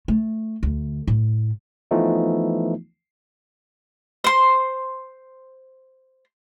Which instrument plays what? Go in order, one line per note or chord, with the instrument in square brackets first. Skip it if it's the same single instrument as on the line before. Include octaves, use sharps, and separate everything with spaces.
[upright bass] A3
D2
A2
[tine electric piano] E3 F3 A3 B3 D#4 F4
[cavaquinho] C5 C6